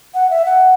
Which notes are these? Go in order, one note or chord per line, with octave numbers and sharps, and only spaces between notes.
F#5
E5
F#5